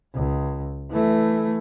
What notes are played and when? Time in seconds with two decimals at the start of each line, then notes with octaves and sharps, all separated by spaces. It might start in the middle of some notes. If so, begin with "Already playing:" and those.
0.14 C#2
0.90 E3 A3